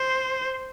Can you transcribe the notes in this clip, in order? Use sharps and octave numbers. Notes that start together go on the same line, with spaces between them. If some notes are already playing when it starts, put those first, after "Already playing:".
Already playing: C5